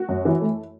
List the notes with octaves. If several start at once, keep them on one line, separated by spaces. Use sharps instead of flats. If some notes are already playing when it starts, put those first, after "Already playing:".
Already playing: F#4
F#2
E3
A3